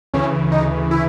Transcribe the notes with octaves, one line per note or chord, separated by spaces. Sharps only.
D2 C#3 E3 C#4
D#4
E4